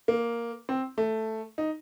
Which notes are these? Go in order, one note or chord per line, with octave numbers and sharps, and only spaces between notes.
A#3
C4
A3
D#4